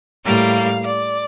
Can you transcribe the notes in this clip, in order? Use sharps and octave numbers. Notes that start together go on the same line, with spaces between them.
A2 G3 A#3 F5
D5